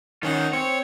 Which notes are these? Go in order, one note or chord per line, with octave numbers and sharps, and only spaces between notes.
D#3 C#4 D#4 F4 F#5
C4 C#5